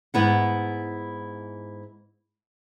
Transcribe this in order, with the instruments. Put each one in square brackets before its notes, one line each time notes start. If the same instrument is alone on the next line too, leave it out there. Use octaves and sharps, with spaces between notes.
[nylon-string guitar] G#2 B3 E4 F#5